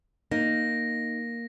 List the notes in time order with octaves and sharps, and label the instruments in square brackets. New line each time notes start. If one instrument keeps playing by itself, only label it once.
[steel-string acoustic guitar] A#3 [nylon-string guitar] D#4 [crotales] A#6